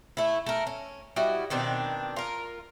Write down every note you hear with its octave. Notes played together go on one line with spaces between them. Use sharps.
A3 E4
A3 A#4
C#4
G3 E4 F#4 D#5
B2 D#3 C4 D4
F4 A#4